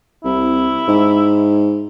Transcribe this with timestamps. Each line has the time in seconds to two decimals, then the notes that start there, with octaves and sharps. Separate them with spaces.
0.24 C2 E4
0.88 G#2